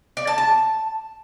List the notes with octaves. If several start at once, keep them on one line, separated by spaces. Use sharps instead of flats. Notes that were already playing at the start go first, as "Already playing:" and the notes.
D5
A5
A5